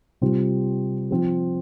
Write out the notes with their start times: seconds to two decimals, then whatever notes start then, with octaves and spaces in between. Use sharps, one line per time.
0.21 C3 G3 C4 F4
1.11 F3 C4 F4